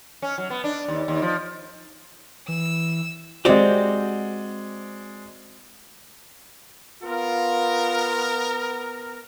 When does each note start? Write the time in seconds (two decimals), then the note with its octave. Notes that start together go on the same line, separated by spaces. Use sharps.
0.22 C#4
0.38 F#3
0.50 B3
0.64 D4
0.88 D#2
1.08 D#2
1.22 F3
2.48 E3 E6
3.45 G#3 C4 F#4 G4 D5
7.03 B3 F4 A#4